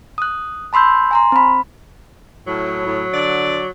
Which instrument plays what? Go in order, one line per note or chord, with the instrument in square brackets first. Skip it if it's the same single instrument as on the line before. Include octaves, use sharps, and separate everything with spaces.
[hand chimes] D#6 F#6
A5 B5 C6 E6 G6
G#5 A#5 C6
C4 B5
[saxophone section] A2 [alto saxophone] F#3
[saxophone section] A2
D3 D5